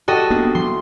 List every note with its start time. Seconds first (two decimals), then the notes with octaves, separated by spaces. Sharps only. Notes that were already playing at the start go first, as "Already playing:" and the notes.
0.08 G3 F#4 A4 D#5
0.30 A#3 B3 D4
0.55 E3 C6